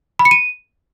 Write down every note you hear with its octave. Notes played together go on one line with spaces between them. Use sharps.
B5
C#7
D#7